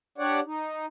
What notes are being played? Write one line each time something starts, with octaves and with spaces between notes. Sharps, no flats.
D4 G4 C#5 D5 F#5
D#4